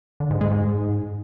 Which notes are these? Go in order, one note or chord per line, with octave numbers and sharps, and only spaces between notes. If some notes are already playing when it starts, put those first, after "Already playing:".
D3
G#2
G#3
G#2